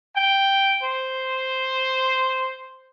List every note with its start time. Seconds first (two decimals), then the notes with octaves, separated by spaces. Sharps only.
0.15 G5
0.81 C5